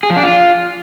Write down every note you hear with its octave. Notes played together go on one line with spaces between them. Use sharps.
G#4
F3
D4
F4